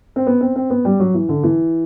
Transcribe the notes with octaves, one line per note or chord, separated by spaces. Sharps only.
C4
B3
C4
C4
B3
G3
F#3
E3
D3
E3